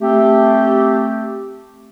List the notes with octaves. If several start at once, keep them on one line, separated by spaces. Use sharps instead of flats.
A3 C4 G4